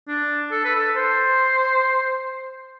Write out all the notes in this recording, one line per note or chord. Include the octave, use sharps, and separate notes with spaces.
D4
A4
B4
A4
C5